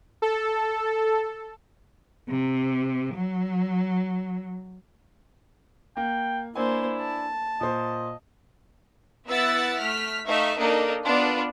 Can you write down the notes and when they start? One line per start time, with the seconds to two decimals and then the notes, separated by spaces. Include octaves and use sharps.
0.22 A4
2.29 C3
3.14 F#3
5.97 A#3 G5
6.55 A#3 D4 E4 C5 G#5
7.00 A5
7.61 A#2 C5 D#5
9.28 B3 E4 E5 F#5 E6 A6
9.80 A3 F6 B6
10.27 A3 D#4 E5 F5 C#6
10.59 A#3 D4 D#4 A4 D#5
11.04 B3 D4 F4